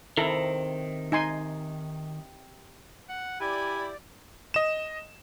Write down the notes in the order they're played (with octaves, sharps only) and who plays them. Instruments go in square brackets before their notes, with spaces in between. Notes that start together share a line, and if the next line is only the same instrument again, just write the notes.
[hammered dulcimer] C3 [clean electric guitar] D#3 [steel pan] E4 A4 A#5
[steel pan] D#4 G#5 C6
[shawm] F#5
[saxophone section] E4 G4 [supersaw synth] D5 [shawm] G#5 [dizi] B5
[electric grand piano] D#5 E7